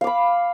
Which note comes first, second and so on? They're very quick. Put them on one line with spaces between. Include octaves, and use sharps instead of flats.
F5 D6 B5